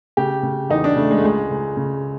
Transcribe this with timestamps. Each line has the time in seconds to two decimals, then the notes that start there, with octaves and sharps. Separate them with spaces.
0.17 C#3 G4
0.43 C#3
0.70 E2 D#4
0.84 D4
0.96 C#3 A3
1.11 G#3
1.17 A3
1.23 C#2 G#3
1.50 C#2
1.77 C#3